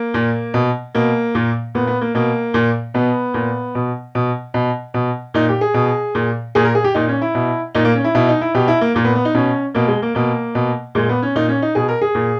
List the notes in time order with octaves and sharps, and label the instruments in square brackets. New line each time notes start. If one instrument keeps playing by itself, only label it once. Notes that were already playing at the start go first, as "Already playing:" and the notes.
Already playing: [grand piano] A#3
A#2
B2
B2 A#3
A#2
A#2 B3
B3
A#3
B2 A#3
A#2
B2 B3
A#2
B2
B2
B2
B2
A#2 D#4
G4
G#4
B2
A#2
A#2 G#4
A#4
G#4
G4
A#2 D#4
C#4
E4
B2
A#2 D#4
A#3
C#4
E4
B2 E4
D#4
E4
B2 G4
E4
A#3
A#2 A#3
B3
B3
D#4
B2 C#4
B2 A#3
G#3
A#3
B2 A#3
B2
A#2 G#3
B3
C#4
A#2 D#4
C#4
D#4
B2 G#4
A#4
G#4
A#2